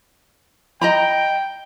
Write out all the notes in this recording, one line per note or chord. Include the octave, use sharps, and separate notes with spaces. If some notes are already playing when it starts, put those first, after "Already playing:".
D#5 G5 A#5 B5